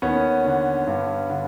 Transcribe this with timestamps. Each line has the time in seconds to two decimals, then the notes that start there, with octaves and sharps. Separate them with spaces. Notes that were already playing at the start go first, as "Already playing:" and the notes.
0.02 D#2 B3 C#4
0.45 D3
0.87 G2
1.30 D3